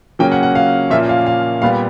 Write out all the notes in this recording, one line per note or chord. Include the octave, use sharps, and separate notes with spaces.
C#3 F#3 A#3 C#4 G5
F#5
F#5
F5
A#2 F3 A#3 C#4 E5
F5
F5
A#2 G3 B3 F5